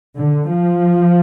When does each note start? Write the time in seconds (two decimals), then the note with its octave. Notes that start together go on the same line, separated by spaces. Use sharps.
0.17 D3
0.49 F3